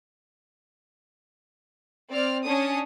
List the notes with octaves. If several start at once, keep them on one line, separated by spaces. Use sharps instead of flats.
C4 D5 F6
C#4 D4 D#6